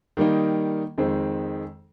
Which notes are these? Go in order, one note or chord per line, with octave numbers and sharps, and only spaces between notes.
D#3 G3 A#3 D#4
F2 D#3 G#3 C4